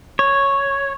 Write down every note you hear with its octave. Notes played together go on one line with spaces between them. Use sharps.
C#5